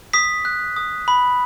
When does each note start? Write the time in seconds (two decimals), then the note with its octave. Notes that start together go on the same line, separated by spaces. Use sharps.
0.13 D#6 B6
0.45 F#6
0.76 D#6
1.08 B5